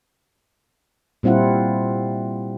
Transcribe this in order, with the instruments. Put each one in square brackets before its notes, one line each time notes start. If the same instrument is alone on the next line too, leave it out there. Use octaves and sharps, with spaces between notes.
[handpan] A#2 G3 C4 E4 F4 F#5